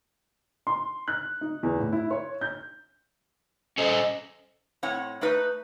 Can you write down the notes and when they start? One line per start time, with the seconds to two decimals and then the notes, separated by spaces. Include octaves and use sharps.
0.67 C6
1.08 F#6
1.41 D#4
1.63 E2
1.80 A2
1.93 E4
2.11 C#5
2.41 G6
3.78 C#4 A4 C5 D#5
4.83 A2 C4 C#5 F#5
5.21 A3 D#4 B4